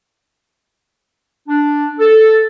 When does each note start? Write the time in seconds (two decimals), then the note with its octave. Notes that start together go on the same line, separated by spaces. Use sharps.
1.48 D4
1.99 A4